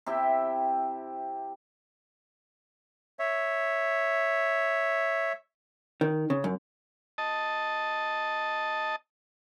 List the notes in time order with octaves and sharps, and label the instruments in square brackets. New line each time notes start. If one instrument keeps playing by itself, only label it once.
[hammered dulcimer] C3 E4 G4 E5
[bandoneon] C#5 E5
[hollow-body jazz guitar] D#3
C#3
F#2
[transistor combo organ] D#5 A5